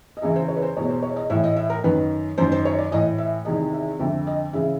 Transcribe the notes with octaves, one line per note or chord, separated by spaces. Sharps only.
D#5
E2 C#3 E3 E5
C5
C#5
B4
C5
E2 B2 C#5
C5
C#5
D#5
A2 E3 E5
D#5
E5
A#4
F#2 D#3 B4
F#2 D#3 C5
C5
C#5
D5
A2 E3 D#5
E5
E2 C3 D#3 D#5
E5
F2 D3 E5
D#5
C#3 E3 E5